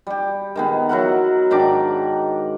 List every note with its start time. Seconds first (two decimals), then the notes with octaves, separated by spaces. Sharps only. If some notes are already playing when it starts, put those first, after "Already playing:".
0.07 G3 G4
0.55 D#3 G#3 B3
0.89 F#3 E4 A#4 F#5
1.51 G#2 D#3 D4 D6